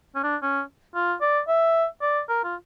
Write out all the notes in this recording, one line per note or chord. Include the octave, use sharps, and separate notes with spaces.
C#4
D4
C#4
F4
D5
E5
D5
A#4
F4